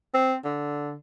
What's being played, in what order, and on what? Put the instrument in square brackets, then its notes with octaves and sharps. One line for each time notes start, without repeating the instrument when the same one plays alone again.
[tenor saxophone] C4
D3